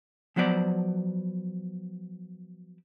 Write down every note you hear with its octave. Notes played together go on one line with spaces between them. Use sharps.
F3 F#3 B3 C5 D5